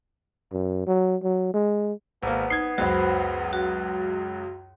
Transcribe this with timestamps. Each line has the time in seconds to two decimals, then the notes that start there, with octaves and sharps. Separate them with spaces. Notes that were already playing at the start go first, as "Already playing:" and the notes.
0.52 F#2
0.87 F#3
1.23 F#3
1.54 G#3
2.23 G#1 A#3 B3
2.50 D#4 G#6 C7
2.78 C#2 F#2 F#4 C5 B5
3.53 F#4